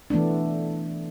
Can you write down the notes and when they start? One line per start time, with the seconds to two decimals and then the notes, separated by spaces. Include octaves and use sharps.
0.10 E3 A3 B3 D4